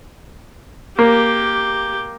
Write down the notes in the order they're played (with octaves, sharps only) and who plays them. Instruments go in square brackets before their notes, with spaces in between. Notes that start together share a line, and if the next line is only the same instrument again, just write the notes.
[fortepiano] A#3 [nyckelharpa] G4